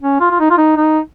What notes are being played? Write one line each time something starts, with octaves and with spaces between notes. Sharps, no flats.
C#4
F4
F4
D#4
F4
D#4
D#4